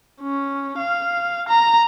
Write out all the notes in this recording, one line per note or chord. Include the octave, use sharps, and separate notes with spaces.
C#4
F5
A#5